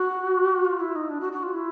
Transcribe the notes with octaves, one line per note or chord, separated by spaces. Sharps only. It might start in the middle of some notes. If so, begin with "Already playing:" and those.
Already playing: F#4
F4
E4
D#4
D4
F#4
F#4
F4
E4